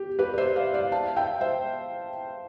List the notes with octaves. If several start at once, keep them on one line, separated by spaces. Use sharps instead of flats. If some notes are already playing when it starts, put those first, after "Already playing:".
Already playing: G4
G4 B4
D5
C5 E5
D5 F5
D5 F5
F5 A5
E5 G5
C5 E5